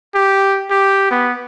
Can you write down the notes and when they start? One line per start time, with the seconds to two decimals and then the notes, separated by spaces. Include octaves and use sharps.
0.15 G4
0.71 G4
1.11 B3